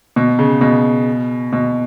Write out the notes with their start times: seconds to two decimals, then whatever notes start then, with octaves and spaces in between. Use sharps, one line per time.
0.16 B2
0.39 C#3
0.61 B2
1.53 B2